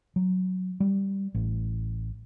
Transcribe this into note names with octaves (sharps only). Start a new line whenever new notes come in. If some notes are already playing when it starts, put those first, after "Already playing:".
F#3
G3
A1